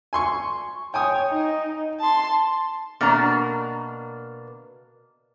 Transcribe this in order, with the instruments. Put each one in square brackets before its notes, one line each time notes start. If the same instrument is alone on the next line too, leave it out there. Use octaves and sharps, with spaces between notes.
[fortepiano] G#5 C6 C#6
[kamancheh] C#5 [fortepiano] G5 G#5 D#6
[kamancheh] D#4
A5 C6
[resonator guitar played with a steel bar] B2 A#3 D4 A#5